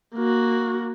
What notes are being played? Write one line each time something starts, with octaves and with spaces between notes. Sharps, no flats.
A#3 F#4